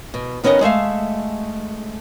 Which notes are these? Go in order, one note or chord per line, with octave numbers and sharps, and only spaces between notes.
B2
D#3 B3 C#4 A#4 D#5
G#3 A3 E5 F5